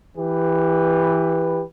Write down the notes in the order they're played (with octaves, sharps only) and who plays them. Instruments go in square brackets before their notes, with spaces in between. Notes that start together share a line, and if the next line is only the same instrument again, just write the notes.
[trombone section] E3 G4 B4